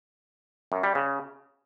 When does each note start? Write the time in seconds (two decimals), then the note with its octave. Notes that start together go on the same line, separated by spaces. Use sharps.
0.72 F#2
0.83 G3
0.95 C#3